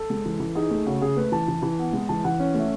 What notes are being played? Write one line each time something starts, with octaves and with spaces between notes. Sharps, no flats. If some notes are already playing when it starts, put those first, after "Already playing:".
Already playing: A4
G#3
E3
E3
D#4 G#4
A3
C#3 F#4
C#3 G#4
A3 B4
E3 A5
E3
E3
B3
G#3
E3 A5
E3 F#5
C#4
A3 E5